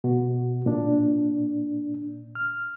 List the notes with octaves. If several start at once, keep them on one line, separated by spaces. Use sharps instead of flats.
B2 F#4
A#2 D4
F6